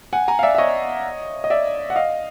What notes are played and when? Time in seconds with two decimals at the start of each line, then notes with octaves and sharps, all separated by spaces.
0.13 F#5 G#5
0.28 G#5 A#5
0.39 F5
0.43 D5 E5
0.55 E5
0.58 C#5 D#5
1.44 D#5
1.50 D5 E5
1.90 F#5
1.96 D#5 F5